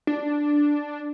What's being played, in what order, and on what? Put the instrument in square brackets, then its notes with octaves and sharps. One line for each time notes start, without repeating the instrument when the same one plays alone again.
[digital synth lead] D4